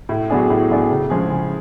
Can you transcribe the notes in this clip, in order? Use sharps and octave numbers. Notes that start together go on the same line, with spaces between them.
A2
F#3 B3 D4 G#4
A2
F#3 B3 D4 G#4
C#3
F3 G#3 C#4 G#4
C#3